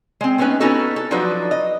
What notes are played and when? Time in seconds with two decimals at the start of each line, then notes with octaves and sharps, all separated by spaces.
0.21 G#3 C4
0.38 A3 B3 C#4 D#4 B4
0.60 B3 C#4 D#4 E4 F#4 A4
0.96 A4
1.11 F3 F#3 D4 D#4 F#4 B4
1.51 D#5